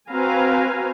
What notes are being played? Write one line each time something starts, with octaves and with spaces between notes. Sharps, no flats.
C4 F#4 B4 F5 G#5 A#5